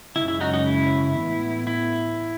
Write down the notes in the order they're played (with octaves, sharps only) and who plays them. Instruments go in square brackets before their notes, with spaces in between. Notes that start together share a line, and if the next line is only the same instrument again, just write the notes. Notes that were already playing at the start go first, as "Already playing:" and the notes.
[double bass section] F#2 C#3 G#3 C#4 [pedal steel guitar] E4
[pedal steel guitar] E4
D#4 F#4
D#4 F#4
E4
[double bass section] A2 E3 B3
[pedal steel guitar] E4